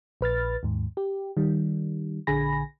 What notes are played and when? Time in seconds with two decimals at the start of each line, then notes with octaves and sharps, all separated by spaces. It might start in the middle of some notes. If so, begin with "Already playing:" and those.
0.21 A#1 B4 F6 A6
0.63 D#2 G#2
0.97 G4
1.37 D#3 G3
2.27 A#1 D3 G#4 G#5 B5 A#6